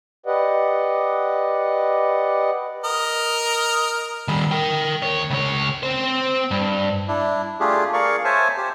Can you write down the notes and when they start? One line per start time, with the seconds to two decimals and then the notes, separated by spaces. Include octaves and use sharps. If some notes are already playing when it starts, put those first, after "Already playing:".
0.26 G4 B4 D5 D#5 F#5
2.84 A#4 D#5
4.28 D#3 G3
4.51 A#4 G5
5.02 D#2 C#5
5.30 C#2 C#5
5.83 C4 C5
6.51 G2
7.08 D4 E4
7.60 A3 D4 F4 G4 G#4
7.93 G#4 A#4 D5 F5 C#6
8.25 C5 C#5 E5 G#5 A5
8.57 G4 C5